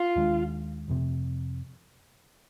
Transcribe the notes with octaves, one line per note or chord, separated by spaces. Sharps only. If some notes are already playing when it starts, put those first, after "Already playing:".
Already playing: F4
D#2 D#3 G#3 D4
F1 F2 C3